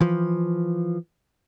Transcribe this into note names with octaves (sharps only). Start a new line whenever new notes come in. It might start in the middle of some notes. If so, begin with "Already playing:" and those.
E3 F3